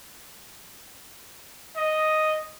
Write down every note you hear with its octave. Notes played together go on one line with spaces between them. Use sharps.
D#5